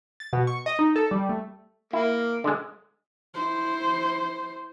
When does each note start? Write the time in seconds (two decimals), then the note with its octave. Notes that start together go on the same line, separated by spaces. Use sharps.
0.20 A6
0.33 B2
0.47 C#6
0.66 D#5
0.79 D#4
0.96 A4
1.11 G3
1.29 A3
1.93 A#3 E4
2.44 D3 G#3
3.34 E4 C5